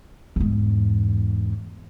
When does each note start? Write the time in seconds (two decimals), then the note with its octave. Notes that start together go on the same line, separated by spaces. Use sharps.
0.36 E2 G#2